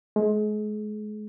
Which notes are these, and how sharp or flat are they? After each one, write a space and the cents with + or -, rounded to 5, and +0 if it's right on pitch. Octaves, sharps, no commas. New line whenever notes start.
G#3 +35